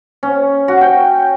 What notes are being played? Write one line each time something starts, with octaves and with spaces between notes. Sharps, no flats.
C#4
F#4
G5